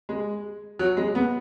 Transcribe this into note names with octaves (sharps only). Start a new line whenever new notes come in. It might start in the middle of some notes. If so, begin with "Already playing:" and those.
G#3
F#3
G#3
B3